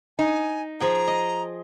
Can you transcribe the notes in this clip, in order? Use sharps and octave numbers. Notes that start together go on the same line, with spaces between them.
D#4 G#5
F3 G#4 G5 A#5
D#5